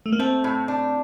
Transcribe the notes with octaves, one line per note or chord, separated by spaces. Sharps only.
A3
A#3
A3 C4
A2
D4